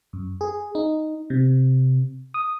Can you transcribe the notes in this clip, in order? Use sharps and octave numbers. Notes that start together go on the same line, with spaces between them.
F#2
G#4
D#4
C3
D#6